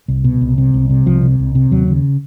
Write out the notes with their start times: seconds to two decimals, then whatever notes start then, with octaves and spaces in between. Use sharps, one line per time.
0.08 C2
0.24 B2
0.41 C2
0.58 C3
0.74 C2
0.90 C3
1.06 C2 F3
1.22 C3
1.39 C2
1.55 C3
1.71 D#2 F#3
1.88 C#3